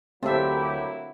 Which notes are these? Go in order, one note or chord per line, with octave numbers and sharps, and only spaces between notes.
D2 F#3 A#3 C4 E4 G4 A4 E5